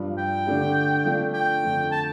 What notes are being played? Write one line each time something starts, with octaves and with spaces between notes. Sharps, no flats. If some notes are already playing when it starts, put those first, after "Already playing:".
Already playing: G2 F3 D4
G5
D3 A3 D4 G4
F3 A3 D4
G5
F2 D3 A3 F4
A5